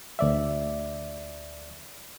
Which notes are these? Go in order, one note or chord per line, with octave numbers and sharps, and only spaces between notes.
D2 D5 E5